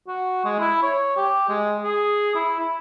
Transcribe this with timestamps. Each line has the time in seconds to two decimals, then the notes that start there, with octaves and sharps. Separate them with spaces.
0.08 F#4
0.45 G#3
0.60 E4
0.83 C#5
1.17 G4
1.49 G#3
1.84 G#4
2.35 E4
2.60 E4